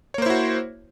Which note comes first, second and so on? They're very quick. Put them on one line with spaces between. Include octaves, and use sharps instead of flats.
C#5 A#3 C5 E4 F#4